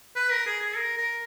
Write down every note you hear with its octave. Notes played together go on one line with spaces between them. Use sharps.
B4
A#4
G#4
G#4
A#4
A#4